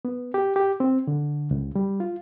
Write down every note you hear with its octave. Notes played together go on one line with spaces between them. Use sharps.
B3
G4
G4
C4
D3
C#2
G3
F4